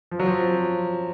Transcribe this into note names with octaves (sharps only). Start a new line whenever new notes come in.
F3
F#3
F3